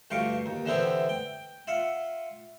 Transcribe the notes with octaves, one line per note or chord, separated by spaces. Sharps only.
D2 G2 F4 F5 C#6 D6
D#2
D3 E3 B3 C4 E4 G4
G5
F4 E5 F#5